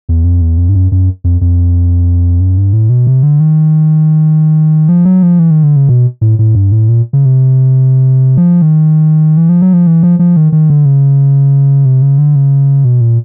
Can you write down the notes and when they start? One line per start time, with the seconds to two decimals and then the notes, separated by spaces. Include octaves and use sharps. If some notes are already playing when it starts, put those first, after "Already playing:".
0.09 E2
0.24 F2
0.41 E2
0.57 F2
0.69 G2
0.75 F#2
0.92 F#2
1.24 F2
1.41 F2
2.40 F#2
2.57 G2
2.73 A2
2.89 B2
3.07 C3
3.23 D3
3.40 D#3
4.89 F3
5.05 F#3
5.23 F3
5.39 E3
5.51 D#3
5.63 D3
5.76 C#3
5.89 B2
6.21 A2
6.39 A2
6.55 G2
6.72 A2
6.89 A#2
7.13 C#3
7.25 C3
8.37 F3
8.62 D#3
9.37 E3
9.49 F3
9.62 F#3
9.73 F3
9.87 E3
10.03 F3
10.19 F3
10.37 D#3
10.52 D#3
10.70 D3
10.85 C#3
11.85 C3
12.02 C#3
12.18 D3
12.35 C#3
12.85 B2
13.01 A#2